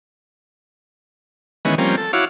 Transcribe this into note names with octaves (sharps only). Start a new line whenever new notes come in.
D#3 E3 G#3 B3 C#4
F3 G3 A#3 C4 C#4
A4
E4 F#4 C#5 F5 D6